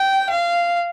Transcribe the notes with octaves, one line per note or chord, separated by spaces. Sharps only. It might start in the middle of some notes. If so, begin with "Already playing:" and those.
Already playing: G5
F5